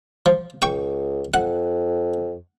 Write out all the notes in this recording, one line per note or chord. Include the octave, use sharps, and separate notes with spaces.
F3
C#2 G5 C#6
F2 F#5